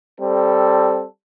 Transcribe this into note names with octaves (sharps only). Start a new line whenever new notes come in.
G3 C4 A4